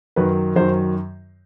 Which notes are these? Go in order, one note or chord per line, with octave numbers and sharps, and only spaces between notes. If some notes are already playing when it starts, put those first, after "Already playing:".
F#2 D#3 F#3 B4
F#2 D#3 F#3 C5